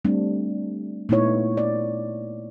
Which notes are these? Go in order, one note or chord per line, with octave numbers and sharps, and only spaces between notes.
G3 A3 C4 D4
A#2 A3 B3 D#4 E4 C#5
D5